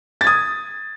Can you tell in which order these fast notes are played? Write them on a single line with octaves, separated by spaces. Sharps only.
A6 G#6 D#6